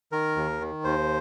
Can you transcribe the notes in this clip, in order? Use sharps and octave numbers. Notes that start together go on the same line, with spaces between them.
D#3 A#4
D#2
D#3
D#2 C5